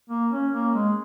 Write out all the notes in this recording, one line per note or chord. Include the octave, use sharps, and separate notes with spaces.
A#3
C#4
A#3
G#3